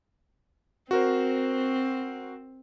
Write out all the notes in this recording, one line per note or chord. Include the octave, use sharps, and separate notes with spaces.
C4 F#4 A#4 C5